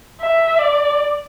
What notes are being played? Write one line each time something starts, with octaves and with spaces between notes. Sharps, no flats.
E5
D5